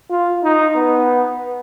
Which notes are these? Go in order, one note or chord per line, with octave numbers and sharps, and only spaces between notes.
F4
D#4
B3